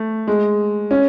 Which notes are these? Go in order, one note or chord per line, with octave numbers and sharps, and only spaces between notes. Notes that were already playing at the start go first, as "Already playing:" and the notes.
Already playing: A3
G#3
C#4